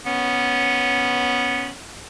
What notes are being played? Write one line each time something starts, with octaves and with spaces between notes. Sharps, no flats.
B3 C#4